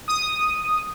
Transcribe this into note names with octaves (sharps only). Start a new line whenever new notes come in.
D#6